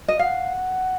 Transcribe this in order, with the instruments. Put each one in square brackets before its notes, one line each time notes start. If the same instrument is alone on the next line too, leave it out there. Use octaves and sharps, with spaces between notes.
[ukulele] D#5
[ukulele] F5 [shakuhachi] F#5